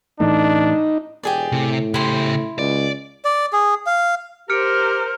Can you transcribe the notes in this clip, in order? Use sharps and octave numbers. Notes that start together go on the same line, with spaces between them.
A2 E3 A3 D4 D#4
E1 G4 G#4 D5
A2 C3
C#3 E4 G4 C6
C#2 D5
D5
G#4
F5
G4 A#4 C5 F6 C#7 D7